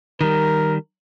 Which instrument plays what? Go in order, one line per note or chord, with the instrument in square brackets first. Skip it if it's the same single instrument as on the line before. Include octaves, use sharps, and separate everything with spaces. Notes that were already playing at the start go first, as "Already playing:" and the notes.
[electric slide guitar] D#3 G3 [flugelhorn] A#4